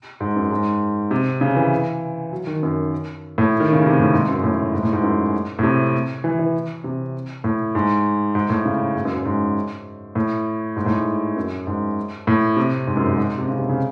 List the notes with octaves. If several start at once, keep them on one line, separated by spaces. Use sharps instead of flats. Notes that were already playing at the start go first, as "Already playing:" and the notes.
G#2
F#2
G#2
C3
C#3
E3
F#3
D#3
F#2
A2
D#3
C#3
C3
A2
G#2
F#2
A2
G#2
A2
G#2
F#2
A2
C3
E3
E3
C3
A2
G#2
G#2
A2
C#3
G#2
F#2
F#2
G#2
A2
G#2
A2
G#2
F#2
G#2
A2
C3
G#2
F#2
G#2
G#2
C3
C#3
C3
C#3